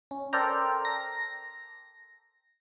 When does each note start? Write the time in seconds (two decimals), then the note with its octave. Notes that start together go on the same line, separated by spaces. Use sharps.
0.11 C#4
0.33 A4 A#4 C5 D5 G5 A#5
0.85 A#6